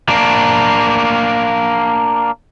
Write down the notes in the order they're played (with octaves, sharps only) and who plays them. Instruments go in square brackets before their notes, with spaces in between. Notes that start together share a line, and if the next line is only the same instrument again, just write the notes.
[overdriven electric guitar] A#3 D4